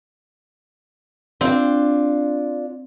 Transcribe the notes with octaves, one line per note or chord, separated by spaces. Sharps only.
C4 D4 F4 D5